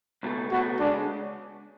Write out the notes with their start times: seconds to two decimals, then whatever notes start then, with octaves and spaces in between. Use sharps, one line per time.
0.23 C#2 B2 A3
0.51 C#2 B2 A3 F#4
0.79 C#2 C#3 G#3 C#4 D4